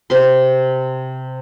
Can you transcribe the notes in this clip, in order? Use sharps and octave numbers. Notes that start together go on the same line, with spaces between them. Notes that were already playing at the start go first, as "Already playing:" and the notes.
C3 C6